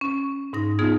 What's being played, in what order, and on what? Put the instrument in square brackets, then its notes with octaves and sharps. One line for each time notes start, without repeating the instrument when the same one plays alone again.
[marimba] C#4
G#2 D#4 A#6
B3 D#4 F4 G#4